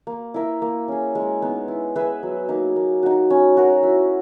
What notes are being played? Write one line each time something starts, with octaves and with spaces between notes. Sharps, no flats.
A#3
E4 A#4 E5
A#3
C#4 G#4
G#3
B3 D#4
E4
G#4 B4 E5
F#3
A#3 D#4
A#3
D#4 F#4
C#4
F#4 A#4
E4